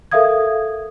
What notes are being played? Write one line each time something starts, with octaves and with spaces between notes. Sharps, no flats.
A4 A#4 E5 F5 D#6 G#6